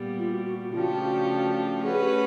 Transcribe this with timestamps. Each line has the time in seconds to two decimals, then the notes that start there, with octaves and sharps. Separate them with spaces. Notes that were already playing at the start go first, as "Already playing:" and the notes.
Already playing: A#2 G3 B3
0.19 F4
0.32 F#4
0.46 F#4
0.59 F#4
0.71 C#3 F3 A3 D4 F4 G4
0.82 F#4
1.83 A3 C#4 F#4 G#4 B4
1.93 G#4
2.01 G4